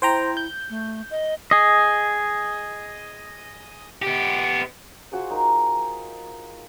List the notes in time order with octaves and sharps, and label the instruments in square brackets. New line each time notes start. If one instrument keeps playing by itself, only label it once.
[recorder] E4 [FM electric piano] C5 G5 A#5
[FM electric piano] G6
[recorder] A3
D#5
[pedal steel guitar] G#4 D#5
[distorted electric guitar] B3 G4
[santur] F4 F#4 G#4 C5
D#4 A#4 F5